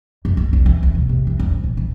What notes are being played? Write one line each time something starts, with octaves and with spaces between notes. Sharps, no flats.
F#2
A#3
C2
E3
D2
B2
C3
E3
E2
F2
A#2
E3